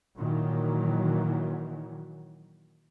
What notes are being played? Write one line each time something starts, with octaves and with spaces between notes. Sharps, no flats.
A#2 D#3 E3 F#3